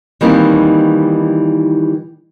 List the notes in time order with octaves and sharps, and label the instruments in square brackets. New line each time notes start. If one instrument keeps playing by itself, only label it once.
[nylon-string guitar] D#3 E3 G3 A#3 C4 D#4